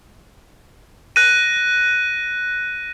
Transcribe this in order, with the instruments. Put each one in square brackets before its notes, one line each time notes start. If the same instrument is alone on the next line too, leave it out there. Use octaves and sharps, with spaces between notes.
[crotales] F#6 A#6 D#7